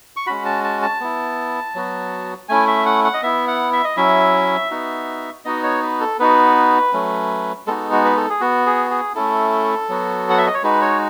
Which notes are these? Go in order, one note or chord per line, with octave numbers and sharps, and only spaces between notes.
C#6
G#3 C#4 F#4 B5
A5
A5
A5
B3 E4
F#3 B3 F#4
A3 C#4 E4 G#5
E5
F#5
F#5
D#5
B3 E4 E5
F#5
E5
D#5
F#3 C#4 E4 E5
B3 D#4 F#4
B3 D#4 F#4 D#5
C#5
B4
A4
B3 D#4 F#4 B4
F#3 A3 C#4
G#3 B3 D#4 F#4 A4
F#4
B4
A4
G#4
B3 F#4
G#4
G#4
A3 C#4 E4 A4
F#3 B3 F#4
F#5
E5
D#5
C#5
G#3 D#4 F#4 B4
C#5